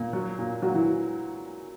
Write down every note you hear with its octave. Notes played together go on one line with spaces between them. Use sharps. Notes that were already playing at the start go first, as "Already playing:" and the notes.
Already playing: A#2
F#3
A#2
A#2 F#3 F#4
E3 E4